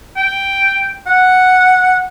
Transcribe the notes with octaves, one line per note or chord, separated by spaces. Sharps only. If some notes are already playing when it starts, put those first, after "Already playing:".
G5
F#5